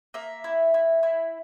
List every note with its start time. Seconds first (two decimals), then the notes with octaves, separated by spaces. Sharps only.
0.14 A#3 E5
0.44 E4
0.74 E4
1.03 E4